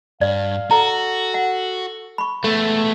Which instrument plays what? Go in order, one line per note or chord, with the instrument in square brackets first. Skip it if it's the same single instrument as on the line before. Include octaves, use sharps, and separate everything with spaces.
[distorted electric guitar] G2 [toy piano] D5 [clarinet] F5
[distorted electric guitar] F#4 [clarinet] A4 [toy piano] A#5
[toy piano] F#5
B5 C#6
[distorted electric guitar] G#3 B3 [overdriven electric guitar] A3